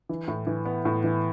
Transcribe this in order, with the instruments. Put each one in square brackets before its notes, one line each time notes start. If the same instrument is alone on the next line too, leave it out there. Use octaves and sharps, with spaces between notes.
[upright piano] E3
A2
E3
B3
A2
E3